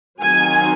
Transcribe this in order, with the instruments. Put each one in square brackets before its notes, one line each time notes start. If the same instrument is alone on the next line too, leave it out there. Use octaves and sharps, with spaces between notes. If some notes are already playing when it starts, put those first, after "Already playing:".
[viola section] D#3 F#3 C4 D#4 G#5